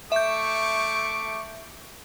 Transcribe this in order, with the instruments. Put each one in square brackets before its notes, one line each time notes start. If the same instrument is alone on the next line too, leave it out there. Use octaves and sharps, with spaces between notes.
[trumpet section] A3 C#6 D6 [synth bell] E5 G6